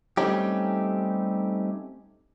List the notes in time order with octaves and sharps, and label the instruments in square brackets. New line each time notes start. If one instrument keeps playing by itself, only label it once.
[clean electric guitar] G3 A3 C4 C#4 D#4 G4